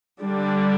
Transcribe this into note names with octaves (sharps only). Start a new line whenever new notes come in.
D3 G3 D4